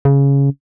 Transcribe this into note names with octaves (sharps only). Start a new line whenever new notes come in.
C#3